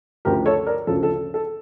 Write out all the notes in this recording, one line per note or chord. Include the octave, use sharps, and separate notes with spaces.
D2 C#3 F3 A3 G4 A#4
A4 C#5
A#4 D5
D2 C#3 F3 A4
A4
A4